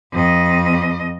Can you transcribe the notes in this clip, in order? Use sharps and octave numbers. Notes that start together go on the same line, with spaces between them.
F2 D#5